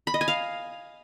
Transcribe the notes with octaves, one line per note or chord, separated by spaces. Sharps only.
B5
D#5
G#5
F5